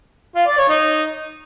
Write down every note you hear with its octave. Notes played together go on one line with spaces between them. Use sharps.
F4
D5
C#5
D#4